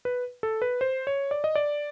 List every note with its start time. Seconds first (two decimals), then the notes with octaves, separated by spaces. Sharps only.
0.05 B4
0.43 A4
0.62 B4
0.81 C5
1.07 C#5
1.31 D5
1.44 D#5
1.55 D5